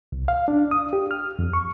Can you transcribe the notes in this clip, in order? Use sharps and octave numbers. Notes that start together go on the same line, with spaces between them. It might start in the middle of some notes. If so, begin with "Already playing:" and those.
C2
F5
D4
D#6
G4
F6
F2
C#6